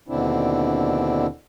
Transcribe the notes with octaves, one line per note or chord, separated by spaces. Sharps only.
D#2 B2 D3 C4 D4 E4